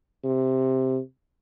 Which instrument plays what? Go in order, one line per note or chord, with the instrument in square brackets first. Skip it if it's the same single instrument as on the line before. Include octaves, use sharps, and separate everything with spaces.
[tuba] C3